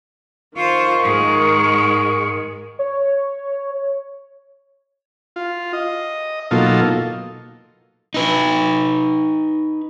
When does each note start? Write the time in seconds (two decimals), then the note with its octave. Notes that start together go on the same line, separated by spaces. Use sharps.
0.56 D#3 F4 C5 C#6
1.03 G#2 G#3
2.79 C#5
5.36 F4
5.73 D#5
6.51 B2 F#3 A#3 D#4 F4 A4
8.14 D#4 B4